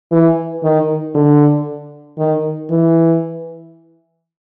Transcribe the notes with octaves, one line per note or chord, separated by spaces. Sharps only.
E3
D#3
D3
D#3
E3